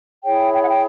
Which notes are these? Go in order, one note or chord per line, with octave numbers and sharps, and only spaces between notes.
E4 G#4 C#5 G5
G5
F#5
G5